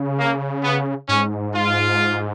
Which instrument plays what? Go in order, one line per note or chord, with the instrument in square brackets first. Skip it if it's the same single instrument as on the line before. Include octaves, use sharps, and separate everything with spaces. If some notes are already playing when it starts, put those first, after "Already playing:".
Already playing: [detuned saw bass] C#3
[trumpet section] A#3
B3
[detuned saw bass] G#2 [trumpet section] C#4
[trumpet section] F4